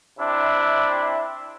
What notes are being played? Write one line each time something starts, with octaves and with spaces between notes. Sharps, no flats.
C3 D4 E4